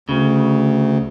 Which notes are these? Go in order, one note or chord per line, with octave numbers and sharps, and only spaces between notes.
D2 C#3